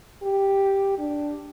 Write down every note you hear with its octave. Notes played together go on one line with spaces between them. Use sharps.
G4
D4